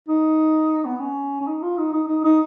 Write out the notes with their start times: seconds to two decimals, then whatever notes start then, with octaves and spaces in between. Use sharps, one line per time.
0.08 D#4
0.85 B3
1.00 C#4
1.41 C#4
1.47 D#4
1.62 F4
1.78 D#4
1.93 D#4
2.08 D#4
2.24 D#4